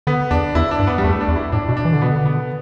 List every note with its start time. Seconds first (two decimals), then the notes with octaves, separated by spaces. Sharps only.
0.07 D3 B3
0.31 E2 D4
0.55 E2 E4
0.71 D4
0.79 G2
0.87 B3
0.98 G3
1.04 E2 A3
1.21 D4
1.28 E2
1.36 E4
1.52 A2 D4
1.69 B2
1.77 D4
1.85 E3
1.93 D3
2.01 B2 B3
2.11 D3
2.25 B3